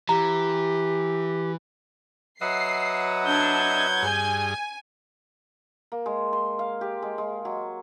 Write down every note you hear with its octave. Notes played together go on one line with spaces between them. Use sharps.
E3 G4 A#5
F#3 B4 D#5 E5 F#5 C7
D4 G6 G#6
G2 G#4 G#5
A#3
G#3
C6
F5
G4
G#3
G#3
F#3